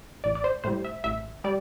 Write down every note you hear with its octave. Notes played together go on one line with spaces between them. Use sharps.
A1 D5
D5
C5
A2 G3 C5
E5
A1 E5
G3 D5